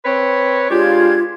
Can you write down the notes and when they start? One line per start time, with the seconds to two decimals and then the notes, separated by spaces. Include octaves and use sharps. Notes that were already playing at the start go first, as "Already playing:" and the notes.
0.05 C4 B4 C#5
0.70 G#3 D4 F4 G4 G#6